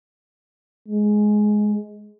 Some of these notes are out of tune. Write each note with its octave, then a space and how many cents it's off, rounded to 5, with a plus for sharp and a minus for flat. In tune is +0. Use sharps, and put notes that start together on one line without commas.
G#3 +10